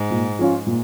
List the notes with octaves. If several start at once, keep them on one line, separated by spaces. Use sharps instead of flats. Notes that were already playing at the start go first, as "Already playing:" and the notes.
Already playing: G#2
A#2
F3 C#4 F4
A#2